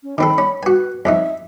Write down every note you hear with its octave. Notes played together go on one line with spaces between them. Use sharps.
C#4
D#3 C4 A4 B5
C#4
F#4 B4 G#5
F2 F3 D#4 E5